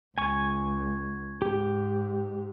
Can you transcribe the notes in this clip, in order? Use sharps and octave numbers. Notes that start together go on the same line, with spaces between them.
C#2 G#5 C#6
G#2 G4